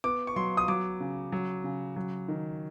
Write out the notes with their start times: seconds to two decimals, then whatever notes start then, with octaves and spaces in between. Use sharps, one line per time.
0.04 B3 D6
0.27 C#6
0.36 F#3 C6
0.57 D#6
0.68 F#3 D6
1.00 C#3
1.32 F#3
1.64 C#3
1.96 F#3
2.28 D#3